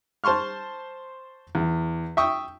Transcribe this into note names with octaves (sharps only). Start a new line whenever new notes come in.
C5 A5 C6 C#6 F6
E2
E5 G5 C#6 D#6